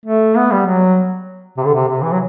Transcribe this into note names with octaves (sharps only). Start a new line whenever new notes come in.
A3
B3
G3
F#3
C3
D3
C3
C3
E3
F#3